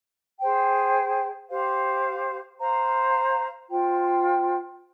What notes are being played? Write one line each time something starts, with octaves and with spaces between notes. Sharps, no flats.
G#4 C5 G5
G4 C5 F5
C5 F5 A#5
F4 C5 G5